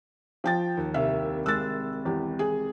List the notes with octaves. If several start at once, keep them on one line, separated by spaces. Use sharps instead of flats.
F3 G5 A6
D#2
C2 E5 F5
G#3 E6 F#6 A6 E7
E2 G4
G#4